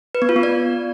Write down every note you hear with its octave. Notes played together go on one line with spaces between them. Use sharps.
B4
B3
F4
B3
D5